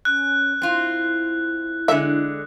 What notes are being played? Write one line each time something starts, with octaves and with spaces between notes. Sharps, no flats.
C#4 F#6
C4 E4 F4
D3 G#3 E5